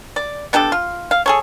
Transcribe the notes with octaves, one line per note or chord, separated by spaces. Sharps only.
D5
B3 D4 G4 A4
F4
F5
G#4 A4 C#5